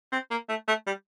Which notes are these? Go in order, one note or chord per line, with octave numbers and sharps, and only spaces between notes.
C4
A#3
A3
A3
G3